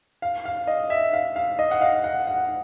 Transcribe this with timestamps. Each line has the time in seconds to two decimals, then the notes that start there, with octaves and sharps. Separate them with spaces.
0.22 F5
0.45 F5
0.67 D#5
0.90 E5
1.13 F5
1.36 F5
1.59 D#5
1.71 F#5
1.81 F5
2.04 F#5
2.27 F#5